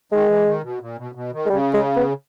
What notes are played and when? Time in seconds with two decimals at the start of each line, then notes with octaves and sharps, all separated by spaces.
0.12 D#3 G#3
0.28 E3
0.46 D#3
0.63 B2
0.81 A#2
0.98 B2
1.15 B2
1.33 D#3
1.46 G#3
1.50 C#3 G3
1.74 G#3
1.96 B3